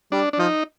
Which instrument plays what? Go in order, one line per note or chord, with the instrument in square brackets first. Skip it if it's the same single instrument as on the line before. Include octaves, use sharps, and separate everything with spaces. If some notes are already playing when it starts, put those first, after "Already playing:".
[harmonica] G3 [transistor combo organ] D4
[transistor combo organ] D4
[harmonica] F3 [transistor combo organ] D#4